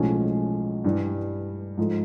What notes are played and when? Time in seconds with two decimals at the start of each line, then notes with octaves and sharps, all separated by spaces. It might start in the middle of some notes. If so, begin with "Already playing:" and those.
Already playing: B1 A2 F3 G#3 C#4
0.84 G2 E3 G3
1.77 G#2 F3 A3